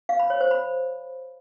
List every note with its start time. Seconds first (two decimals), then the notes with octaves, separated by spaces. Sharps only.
0.09 F5
0.20 B5
0.30 C#5
0.40 C5
0.51 B5